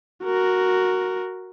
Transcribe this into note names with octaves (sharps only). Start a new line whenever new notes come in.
F#4 A#4